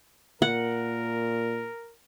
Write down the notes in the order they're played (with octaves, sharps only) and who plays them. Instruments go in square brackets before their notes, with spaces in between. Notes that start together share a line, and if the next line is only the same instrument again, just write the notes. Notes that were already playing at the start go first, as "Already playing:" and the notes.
[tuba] A#2 [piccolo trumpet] A#4 [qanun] F#5